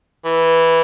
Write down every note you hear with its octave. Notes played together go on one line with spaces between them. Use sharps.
E3